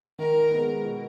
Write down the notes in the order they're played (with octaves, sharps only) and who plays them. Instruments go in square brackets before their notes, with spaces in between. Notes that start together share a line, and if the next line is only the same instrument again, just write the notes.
[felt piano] D#3 [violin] A#4
[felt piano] G#3 B3
B2